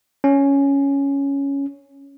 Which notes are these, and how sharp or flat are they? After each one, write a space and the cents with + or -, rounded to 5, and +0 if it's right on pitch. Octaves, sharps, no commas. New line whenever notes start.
C#4 +5